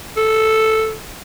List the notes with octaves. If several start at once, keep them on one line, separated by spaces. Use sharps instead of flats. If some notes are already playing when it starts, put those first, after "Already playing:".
A4